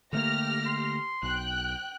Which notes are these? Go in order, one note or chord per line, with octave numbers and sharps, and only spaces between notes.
D3 A3 A#3 G4 F6 A#6
C6
B1 G5 F#6